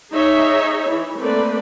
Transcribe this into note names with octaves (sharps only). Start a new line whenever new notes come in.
D#4 G#4 C#5 E5
E3
A3 A#3 C4 B4 D5